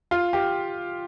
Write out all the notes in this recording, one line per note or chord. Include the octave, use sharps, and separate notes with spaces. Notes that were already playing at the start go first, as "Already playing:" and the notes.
F4
G4